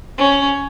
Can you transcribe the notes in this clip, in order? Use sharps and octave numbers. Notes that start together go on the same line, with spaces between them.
C#4